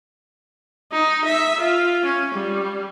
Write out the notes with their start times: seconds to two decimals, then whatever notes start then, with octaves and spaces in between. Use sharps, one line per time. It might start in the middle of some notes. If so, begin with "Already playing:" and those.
0.92 D#4
1.24 E5
1.60 F4
2.05 C#4
2.34 G3